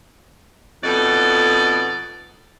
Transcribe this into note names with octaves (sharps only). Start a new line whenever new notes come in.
F2 B2 D#4 A4 D5